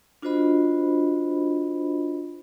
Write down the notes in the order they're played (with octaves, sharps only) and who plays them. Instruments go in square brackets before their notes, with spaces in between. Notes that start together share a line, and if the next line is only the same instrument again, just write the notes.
[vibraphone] D4 F4 F#4 C5 D#5 B5